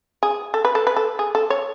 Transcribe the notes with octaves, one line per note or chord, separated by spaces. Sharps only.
G#4
A4
B4
A4
B4
A4
G#4
A4
C#5